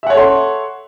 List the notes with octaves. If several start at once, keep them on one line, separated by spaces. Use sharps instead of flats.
A4 C#5 E5 F#5 C6